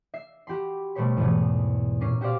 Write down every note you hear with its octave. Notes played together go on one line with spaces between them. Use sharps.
E5 C7
F#4 G4 B5 C6
B2 G3 A3 C5 C#5 B5
E2 G#2 B2 E3 A3
A#2 A#3 C#4 C7
F#4 G4 C5 D5 F5